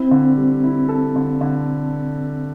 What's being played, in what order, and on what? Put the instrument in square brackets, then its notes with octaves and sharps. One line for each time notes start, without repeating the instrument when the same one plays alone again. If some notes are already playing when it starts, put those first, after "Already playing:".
Already playing: [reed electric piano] C4 [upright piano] E4
[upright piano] D3
G3
E4
A4
D3
D3